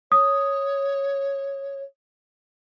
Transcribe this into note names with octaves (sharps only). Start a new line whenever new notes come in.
C#5 D#6